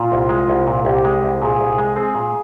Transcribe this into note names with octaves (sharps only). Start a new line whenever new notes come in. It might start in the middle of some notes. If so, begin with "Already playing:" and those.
Already playing: A#2 F4
C2
G#3
C2
A#2
C2 G4
G#3
C2
A#2 G#4
C2
G#3
C4 G#4
A#2